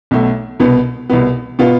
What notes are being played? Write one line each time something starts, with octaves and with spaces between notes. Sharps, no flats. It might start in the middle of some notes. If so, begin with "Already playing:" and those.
B1 B2 A3
C2 B2 B3
C2 B2 B3
B2 B3 F4